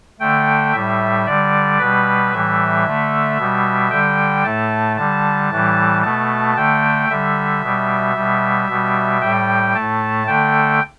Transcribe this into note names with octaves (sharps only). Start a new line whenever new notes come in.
D3 A3 G5
A2 G3 E5
D3 G3 D5
B2 G3 B4
A2 E3 G3 E5
D3 A3
B2 G3
D3 G3 G5
A2 A3 A5
D3 G3 A5
A2 E3 G3
B2 A3 A5
D3 A3 G5
D3 G3 E5
B2 G3
B2 G3
B2 G3
A2 G3 G5
A2 A3 A5
D3 A3 G5